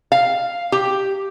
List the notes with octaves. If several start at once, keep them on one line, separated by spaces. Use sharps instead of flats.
F5
G4